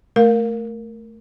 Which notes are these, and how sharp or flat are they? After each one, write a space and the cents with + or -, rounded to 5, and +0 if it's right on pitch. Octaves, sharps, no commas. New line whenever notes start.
A3 +0 A#4 +0 F5 +10